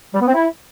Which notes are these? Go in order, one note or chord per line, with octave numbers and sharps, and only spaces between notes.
G3
B3
C4
E4